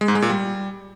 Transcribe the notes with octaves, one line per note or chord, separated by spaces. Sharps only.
G#3
G#2
G#3
A#2
G3